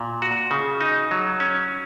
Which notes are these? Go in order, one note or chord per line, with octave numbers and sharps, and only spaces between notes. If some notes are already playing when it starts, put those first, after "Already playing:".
Already playing: A#2
F#4
C#3
D#4
F#3
C#4